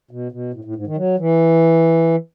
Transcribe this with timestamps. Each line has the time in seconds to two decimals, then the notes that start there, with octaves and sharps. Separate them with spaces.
0.11 B2
0.32 B2
0.54 A2
0.65 A2
0.75 G#2
0.87 D#3
0.97 F#3
1.19 E3